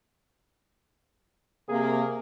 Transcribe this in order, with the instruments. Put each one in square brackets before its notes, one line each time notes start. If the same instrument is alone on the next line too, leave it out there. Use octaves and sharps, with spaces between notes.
[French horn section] C3 A#3 [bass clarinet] G#4